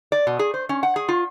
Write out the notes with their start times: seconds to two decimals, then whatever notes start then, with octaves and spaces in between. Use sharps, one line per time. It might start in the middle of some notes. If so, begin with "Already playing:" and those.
0.12 D5
0.27 B2
0.39 G#4
0.54 C5
0.69 C#4
0.83 F#5
0.96 G#4
1.09 F4